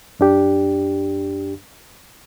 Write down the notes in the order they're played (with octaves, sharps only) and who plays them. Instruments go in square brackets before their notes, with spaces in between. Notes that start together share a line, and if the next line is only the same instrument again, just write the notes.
[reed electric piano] F#2 D4 G4